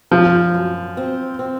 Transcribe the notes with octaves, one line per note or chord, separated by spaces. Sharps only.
F#2 F3
F#2
C4
C4